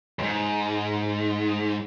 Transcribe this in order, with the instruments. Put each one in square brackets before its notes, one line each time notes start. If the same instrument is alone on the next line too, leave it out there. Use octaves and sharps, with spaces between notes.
[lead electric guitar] F2 G#2